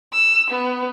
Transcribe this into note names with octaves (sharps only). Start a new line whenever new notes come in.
E6
B3